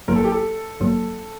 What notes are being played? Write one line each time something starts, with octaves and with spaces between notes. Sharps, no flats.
A1 G2 F#3 A#3 A#4
A4
G4
A4
A1 G2 F#3 A#3